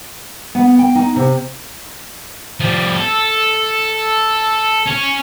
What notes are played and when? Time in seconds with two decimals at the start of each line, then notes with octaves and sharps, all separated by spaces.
0.55 B3
0.79 G5
0.95 D#4
1.16 C3
2.60 F3 G3
2.95 A4
4.86 C#4